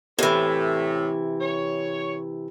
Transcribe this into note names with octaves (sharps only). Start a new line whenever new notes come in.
A2 C3 E3
C#5